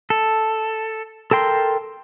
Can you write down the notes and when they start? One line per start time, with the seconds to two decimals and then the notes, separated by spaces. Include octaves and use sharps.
0.10 A4
1.31 A4 A#4 G5 C6